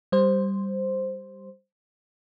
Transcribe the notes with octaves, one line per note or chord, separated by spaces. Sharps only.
G3 C5